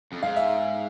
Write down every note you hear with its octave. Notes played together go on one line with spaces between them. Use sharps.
F2
G#2 F5
E5